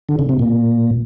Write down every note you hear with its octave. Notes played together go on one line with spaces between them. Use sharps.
D3
C#3
C3
A#2